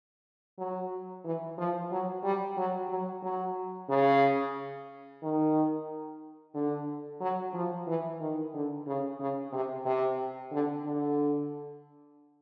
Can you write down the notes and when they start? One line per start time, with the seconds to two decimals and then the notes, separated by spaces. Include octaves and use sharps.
0.58 F#3
1.25 E3
1.58 F3
1.91 F#3
2.24 G3
2.57 F#3
2.90 F#3
3.23 F#3
3.89 C#3
5.22 D#3
6.54 D3
7.21 F#3
7.54 F3
7.87 E3
8.20 D#3
8.54 D3
8.87 C#3
9.20 C#3
9.53 C3
9.85 C3
10.52 D3
10.85 D3